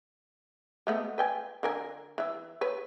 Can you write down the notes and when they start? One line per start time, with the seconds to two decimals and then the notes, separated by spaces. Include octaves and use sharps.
0.87 G#3 A3 B3
1.18 B4 G5 G#5
1.63 D3 A#4 G#5
2.18 E3 E4
2.61 B4 C#5